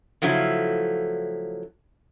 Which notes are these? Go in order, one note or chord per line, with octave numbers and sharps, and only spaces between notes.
C#3 F3 F#3 A3 E4